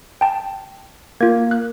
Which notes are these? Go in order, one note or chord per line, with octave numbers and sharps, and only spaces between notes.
G5 A5
A#3 F4 G#6
F#6